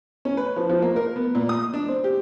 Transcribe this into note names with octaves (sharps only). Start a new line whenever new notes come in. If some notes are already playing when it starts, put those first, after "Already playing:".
C#4
B4
F3
F3
A#3
A#4
B3
A#2
D#6
D4
C4
G4